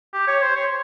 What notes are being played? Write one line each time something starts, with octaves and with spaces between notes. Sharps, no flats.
G4
C#5
C5
C#5